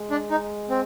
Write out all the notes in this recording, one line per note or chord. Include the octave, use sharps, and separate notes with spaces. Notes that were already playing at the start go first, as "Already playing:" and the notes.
Already playing: G#3
D4
D#4
C4